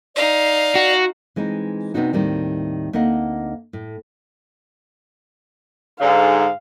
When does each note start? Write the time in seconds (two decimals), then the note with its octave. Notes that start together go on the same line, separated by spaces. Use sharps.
0.16 D#4 D5 F5
0.75 F#4
1.36 E3 G#3 C4 D#4
1.94 C3 B3 C4 D4 D#4 F#4
2.13 D#2 A2 D#3 G3 C4
2.93 D2 A#3 C4 D#4 D#5 F#5
3.73 A2
6.00 G#2 D3 F5